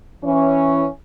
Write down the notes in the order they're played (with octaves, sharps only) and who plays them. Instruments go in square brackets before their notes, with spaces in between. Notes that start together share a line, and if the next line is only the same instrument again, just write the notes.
[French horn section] E3 C#4